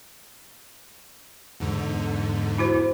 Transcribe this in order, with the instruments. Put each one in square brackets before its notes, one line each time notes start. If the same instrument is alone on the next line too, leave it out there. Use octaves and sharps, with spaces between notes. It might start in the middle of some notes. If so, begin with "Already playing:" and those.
[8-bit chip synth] E2 G#2 D3
[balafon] E4 F#4 C5